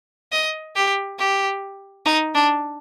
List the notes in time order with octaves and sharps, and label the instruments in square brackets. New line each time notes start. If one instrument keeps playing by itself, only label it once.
[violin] D#5
G4
G4
D#4
D4